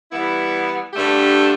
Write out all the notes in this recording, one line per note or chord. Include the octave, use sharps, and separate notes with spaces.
E3 G3 B3 E4
G2 D3 A3 D4 G4